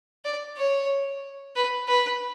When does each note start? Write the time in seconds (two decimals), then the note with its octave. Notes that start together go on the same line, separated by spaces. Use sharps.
0.25 D5
0.57 C#5
1.56 B4
1.88 B4